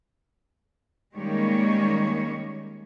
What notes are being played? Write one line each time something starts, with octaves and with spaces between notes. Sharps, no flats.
D#3 G3 G#3 A#3 C#4 C#5